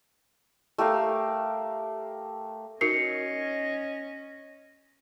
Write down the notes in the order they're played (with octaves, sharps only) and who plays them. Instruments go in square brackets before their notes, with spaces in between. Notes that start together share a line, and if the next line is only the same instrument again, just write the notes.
[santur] A3 G4 A#4 F5
[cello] C#4 D#5 [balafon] D#4 F#4 A#4 [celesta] C7 C#7